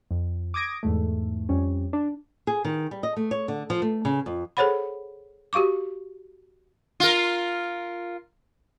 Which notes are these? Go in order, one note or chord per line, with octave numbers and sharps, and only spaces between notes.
F2
D6 D#6 G#6 A#6 D7
E2 G#2 A3
F2 G3 C#4
D4
G#4
D#3
G3
D#5
A3
C#5
D3
F3
A3
C#3
F2
G#4 A4 C5 C#5 F#5 B5
F#4 G4 F5 C#6 D6
F4 A#4